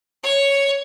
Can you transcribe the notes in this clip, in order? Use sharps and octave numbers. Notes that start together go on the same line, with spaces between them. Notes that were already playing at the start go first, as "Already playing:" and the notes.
C#5